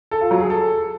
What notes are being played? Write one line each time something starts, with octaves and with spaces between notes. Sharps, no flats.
A4
F4
F#3
G#4
A4